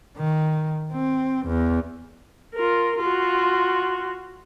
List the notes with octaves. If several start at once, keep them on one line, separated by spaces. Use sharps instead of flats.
D#3
C4
E2
F4 A#4
F4 F#4